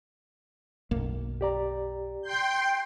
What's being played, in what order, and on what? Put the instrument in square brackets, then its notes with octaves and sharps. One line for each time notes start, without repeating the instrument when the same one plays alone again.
[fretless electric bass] B1 F#2 A#3
[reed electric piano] G4 D5 A#5
[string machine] G5 C6 G6